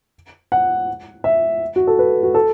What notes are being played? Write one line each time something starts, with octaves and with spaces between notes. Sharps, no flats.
F#5
E5
F#4
A4
B4
F#4
A4